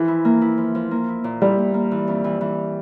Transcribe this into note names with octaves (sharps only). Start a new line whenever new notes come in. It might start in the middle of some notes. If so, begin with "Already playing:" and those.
Already playing: E3 F3
E4
A#3
E4
F3
F3
A#3
E4
A#2
G3 E4
A#2
A#3
E3
F2
E3
E3